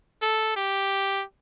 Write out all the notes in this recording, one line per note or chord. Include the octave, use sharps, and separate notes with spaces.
A4
G4